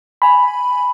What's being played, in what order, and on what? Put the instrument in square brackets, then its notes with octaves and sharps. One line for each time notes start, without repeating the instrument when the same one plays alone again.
[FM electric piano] G#5 B5